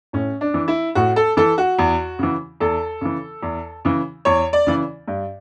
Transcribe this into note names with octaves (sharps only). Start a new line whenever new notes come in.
A2 C#4
D4
E3
E4
A2 F#4
A4
E3 A4
F#4
E2
C#3 E3
E2 A4
C#3 E3
E2
C#3 E3
E2 C#5
D5
C#3 E3
G2